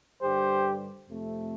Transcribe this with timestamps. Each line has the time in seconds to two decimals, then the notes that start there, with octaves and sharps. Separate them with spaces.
0.21 G2 D3 G3 G4 C5
1.08 F2 C3 A3